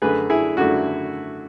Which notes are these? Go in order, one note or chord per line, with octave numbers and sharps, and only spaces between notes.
F#2 D3 A3 G#4 B4
E4 G#4
F#2 D3 A3 F#4